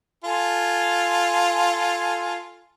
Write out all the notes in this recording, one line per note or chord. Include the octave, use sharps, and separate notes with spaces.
F4 A4 G#5